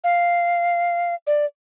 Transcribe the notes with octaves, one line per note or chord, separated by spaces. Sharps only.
F5
D5